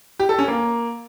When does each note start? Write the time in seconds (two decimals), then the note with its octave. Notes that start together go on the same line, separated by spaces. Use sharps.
0.20 G4
0.29 A4
0.39 C#4
0.48 A#3